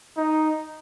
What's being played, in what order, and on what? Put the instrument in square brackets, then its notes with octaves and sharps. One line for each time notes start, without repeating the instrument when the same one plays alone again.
[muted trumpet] D#4